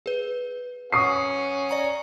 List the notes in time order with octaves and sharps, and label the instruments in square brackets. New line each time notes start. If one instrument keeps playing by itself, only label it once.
[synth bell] G#4 B4
[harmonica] C#4 F#5 G#5 [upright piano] C#6 D#6 C7
[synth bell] D5 A#5 C#7